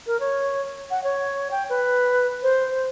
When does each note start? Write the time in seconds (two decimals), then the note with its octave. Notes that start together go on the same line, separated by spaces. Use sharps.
0.07 A#4
0.20 C#5
0.91 F#5
1.04 C#5
1.51 G5
1.70 B4
2.43 C5